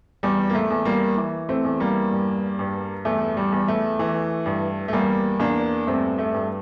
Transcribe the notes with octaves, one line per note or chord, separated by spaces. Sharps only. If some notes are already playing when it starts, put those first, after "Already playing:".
E2 G3
A#3
A3
E2
G3 A#3
E3
A3 C4
E2
G3 A#3
G2
G2
E2 A3
G3
E2
A3
E3
G2
A3
E2 G3 A#3
E2 A#3 D4
G2 A3 C4
A3
G2